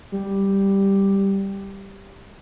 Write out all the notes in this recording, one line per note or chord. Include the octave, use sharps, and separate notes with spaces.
G3